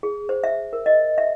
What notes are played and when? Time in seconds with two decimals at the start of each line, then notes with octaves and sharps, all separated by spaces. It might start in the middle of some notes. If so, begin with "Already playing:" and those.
0.03 G#4
0.29 C5
0.44 E5
0.73 A#4
0.86 D#5
1.18 E5